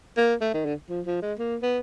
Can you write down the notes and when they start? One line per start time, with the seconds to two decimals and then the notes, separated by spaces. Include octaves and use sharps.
0.17 A#3
0.41 A3
0.54 D#3
0.65 D3
0.90 F3
1.06 F3
1.22 G#3
1.39 A#3
1.63 B3